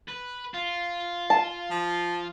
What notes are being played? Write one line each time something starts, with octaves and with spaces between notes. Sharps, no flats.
B4
F4
A5
F3